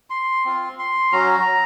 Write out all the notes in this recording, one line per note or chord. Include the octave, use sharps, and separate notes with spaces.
C6
C4 F4
C6
F#3 C#4 F#4 A#5